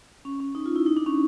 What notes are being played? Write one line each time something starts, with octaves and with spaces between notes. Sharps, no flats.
C#4
C#4
D#4
F4
E4
D#4
D4
C#4